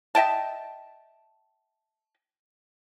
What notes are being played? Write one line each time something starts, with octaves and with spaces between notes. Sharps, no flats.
D#5 E5 G5 A5